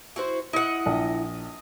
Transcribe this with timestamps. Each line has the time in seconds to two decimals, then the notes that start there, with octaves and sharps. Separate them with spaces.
0.16 E4 F#4 C5
0.53 E4 D#5 F#5
0.86 A#1